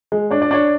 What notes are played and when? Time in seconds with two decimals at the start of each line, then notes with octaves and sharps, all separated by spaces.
0.12 G#3
0.31 D4 C#5
0.42 D5
0.51 D4 C#5